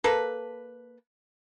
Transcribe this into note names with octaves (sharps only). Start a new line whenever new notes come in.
A#3 A4 B4